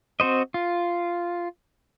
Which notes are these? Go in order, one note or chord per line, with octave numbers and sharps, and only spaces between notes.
C4 F#4 C5 D#5
F4